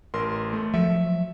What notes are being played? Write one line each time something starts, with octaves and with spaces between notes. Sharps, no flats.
A1 A#4 C6
A3
F3 F#3 E5